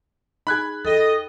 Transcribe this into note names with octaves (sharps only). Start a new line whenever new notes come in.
D#4 G#4 B5 F#6 G#6
E2 A4 D#5 G5